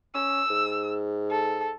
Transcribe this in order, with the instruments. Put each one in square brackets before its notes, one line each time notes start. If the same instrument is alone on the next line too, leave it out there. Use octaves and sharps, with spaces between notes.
[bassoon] C#4 [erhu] E6
[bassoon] G#2
[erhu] A4